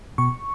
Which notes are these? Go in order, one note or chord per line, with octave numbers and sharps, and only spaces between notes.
B2 C#6